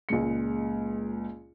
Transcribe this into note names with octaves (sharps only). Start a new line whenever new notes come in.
C#2 A#2 G#3 C#7